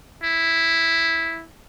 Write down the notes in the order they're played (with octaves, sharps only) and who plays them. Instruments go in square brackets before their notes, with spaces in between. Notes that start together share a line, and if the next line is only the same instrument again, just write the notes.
[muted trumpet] E4